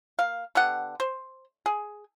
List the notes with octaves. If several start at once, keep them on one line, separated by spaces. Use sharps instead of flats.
A#3 F5
D3 B3 G4 F#5
C5
G#4